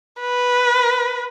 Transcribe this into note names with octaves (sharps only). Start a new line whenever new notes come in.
B4